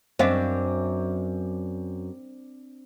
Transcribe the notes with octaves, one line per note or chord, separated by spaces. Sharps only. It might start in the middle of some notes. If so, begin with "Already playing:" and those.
F#2 C4 D4 C5 D#5 F5